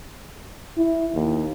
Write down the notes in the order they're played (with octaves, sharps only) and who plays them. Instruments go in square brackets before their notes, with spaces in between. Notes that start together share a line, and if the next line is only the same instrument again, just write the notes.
[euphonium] E4
D#2